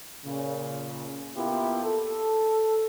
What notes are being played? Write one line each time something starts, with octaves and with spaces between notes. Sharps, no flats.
A#2 C#3
A#3 B3 E4 F4 G4
A4